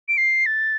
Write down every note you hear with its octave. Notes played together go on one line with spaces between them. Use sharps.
D7
C7
A6